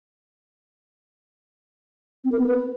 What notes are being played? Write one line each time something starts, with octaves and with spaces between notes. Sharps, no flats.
C4
A#4
B3
B4